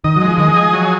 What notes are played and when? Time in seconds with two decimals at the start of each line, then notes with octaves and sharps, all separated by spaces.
0.04 D#3 D#5
0.16 F#3
0.21 G#3
0.28 F3
0.38 D#3 D#5
0.48 F3
0.56 G#4
0.74 F#3